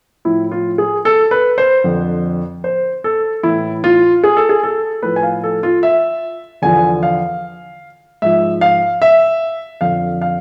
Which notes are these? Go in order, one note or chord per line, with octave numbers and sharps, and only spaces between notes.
A2 F3 E4
F4
G#4
A4
B4
C5
F2 D3 F3
C5
A4
A2 E3 E4
F4
G#4
A4
G#4
A4
A2 F3 B4
G#5
F5
A4
F4
E5
E2 D3 F3 G#5
F5
G#2 F3 E5
F5
E5
F2 D3 F3 F5
F5